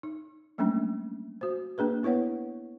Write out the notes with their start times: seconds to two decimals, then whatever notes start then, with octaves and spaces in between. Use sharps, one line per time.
0.03 D#4
0.58 F#3 G3 A3 A#3 C#4 D4
1.41 F#4 C5
1.78 A#3 D4 G#4 B4
2.03 B3 E4 B4 C#5 F#5